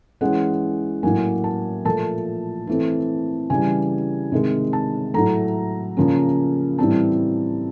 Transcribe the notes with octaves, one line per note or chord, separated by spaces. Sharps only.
E3 G#3 C#4 F#5
A2 F#3 A#3 G#5
A5
A#2 F3 A3 A5
E3 A3 C4
C#3 E3 G3 G#5
C3 D#3 G#3
A5
A2 F#3 A3 A#5
C#3 F3 A#3 C#4
A2 E3 G3 C4 A5